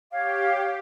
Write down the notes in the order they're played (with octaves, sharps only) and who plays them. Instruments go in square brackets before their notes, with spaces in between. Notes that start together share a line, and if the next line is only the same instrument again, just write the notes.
[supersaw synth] G4 [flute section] C#5 F5